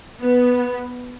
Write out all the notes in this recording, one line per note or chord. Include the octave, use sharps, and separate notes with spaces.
B3